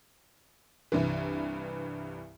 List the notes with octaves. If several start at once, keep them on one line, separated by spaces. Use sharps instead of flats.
C2 G2 E3